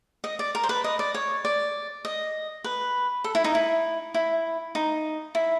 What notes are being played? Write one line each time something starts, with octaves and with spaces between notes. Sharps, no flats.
D#5
D5
A#4
C5
B4
D#5
D5
C#5
D5
D#5
B4
A4
E4
D#4
E4
E4
D#4
E4